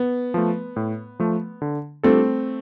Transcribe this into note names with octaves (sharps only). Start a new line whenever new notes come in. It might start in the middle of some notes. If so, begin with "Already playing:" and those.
Already playing: B3
F3 A3
A2
F3 A3
D3
G3 A3 C4 D4 F4 A4